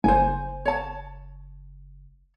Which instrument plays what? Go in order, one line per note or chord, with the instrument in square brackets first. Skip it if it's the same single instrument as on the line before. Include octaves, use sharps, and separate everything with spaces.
[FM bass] F#1 [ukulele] C5 G#5
[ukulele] C#5 A5